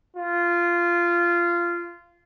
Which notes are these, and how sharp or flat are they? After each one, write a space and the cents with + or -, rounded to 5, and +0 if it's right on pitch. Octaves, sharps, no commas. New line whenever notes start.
F4 -15